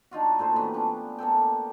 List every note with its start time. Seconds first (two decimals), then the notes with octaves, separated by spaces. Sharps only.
0.11 D4 D#4 F4 F#4
0.39 A#2 A3 C5 C6
0.56 C3 E3 B3
0.74 C#4 D4 F4
1.18 A#3 B3 A4 G5